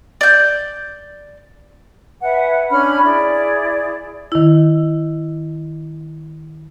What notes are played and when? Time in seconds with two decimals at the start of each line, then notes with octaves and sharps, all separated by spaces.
0.21 D5 G6
2.22 B4 E5 F#5 G#5
2.69 C#4 D4 B5 F6
3.04 E4 G#4 D5
4.32 D#3 E4